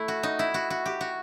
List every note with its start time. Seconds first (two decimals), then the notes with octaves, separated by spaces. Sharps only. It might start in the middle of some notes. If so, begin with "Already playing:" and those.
Already playing: A3 E4
0.08 F#4
0.23 D#4
0.39 E4
0.54 F#4
0.70 F#4
0.86 G4
1.01 F#4